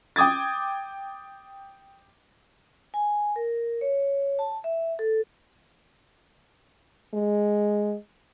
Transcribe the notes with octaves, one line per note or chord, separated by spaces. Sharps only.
G5 D6 D#6 G#6 A6
G#5
A#4
C#5
A5
E5
A4
G#3